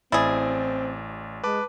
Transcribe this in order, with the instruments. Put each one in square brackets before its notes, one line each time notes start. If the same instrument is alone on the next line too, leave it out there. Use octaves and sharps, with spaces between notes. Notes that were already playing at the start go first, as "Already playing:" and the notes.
[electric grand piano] A1 D5 A6 [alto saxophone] C4 [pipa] E4 G#4
[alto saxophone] G#3 [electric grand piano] B4 A5 D6